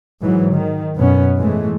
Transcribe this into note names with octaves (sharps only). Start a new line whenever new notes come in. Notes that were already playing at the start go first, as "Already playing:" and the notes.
G#2 E3 F#3
D#3
F#2 B2 B3 C#4
G#2 E3 G#3 A3